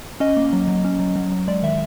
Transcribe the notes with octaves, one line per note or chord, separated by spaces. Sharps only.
C#4 D#5
A#3
F#3
F#3
C#4
F#3
F#3
F#3
G#3 D5
D#3 E5